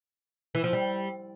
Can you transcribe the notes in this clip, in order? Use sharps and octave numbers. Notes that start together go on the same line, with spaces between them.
E3
F3
G3